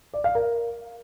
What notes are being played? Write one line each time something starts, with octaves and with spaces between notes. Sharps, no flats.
D5
F5
A#4